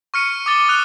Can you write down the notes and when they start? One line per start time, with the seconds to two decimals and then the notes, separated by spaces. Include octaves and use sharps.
0.14 C#6 F6 C#7 D#7
0.46 D6 D#6 A6 G7
0.68 D#6 F#6 F7 G7